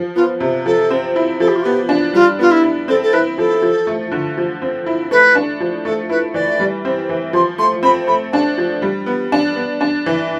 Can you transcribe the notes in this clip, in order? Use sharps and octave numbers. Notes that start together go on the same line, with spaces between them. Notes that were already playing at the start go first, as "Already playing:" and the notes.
Already playing: F3
B3 F4
C3
F3 A4
C4
E4
F3 A4
G4
F4
B3 G4
D4
G3 F4
B3 F4
E4
E4
C4 A4
A4
E4 B4
F3 A4
F3
A3
D3
F3
C4
E4
A3 B4
D4
F3
A3 A4
E4 B4
E3 D5
G3
C4
E3
F3 C6
A3 C6
C4 B5
A3 B5
D4 A5
F3
G3
B3
D4
B3
D4
E3